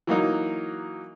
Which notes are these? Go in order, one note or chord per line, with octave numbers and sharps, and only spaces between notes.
E3 F#3 A#3 D#4